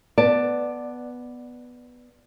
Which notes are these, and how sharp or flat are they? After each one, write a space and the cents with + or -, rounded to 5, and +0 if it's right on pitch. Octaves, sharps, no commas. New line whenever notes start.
B3 +0 D5 +10 A5 +0